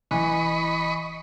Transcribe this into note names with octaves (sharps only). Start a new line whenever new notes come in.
D1 E3 D#5 B5 C#6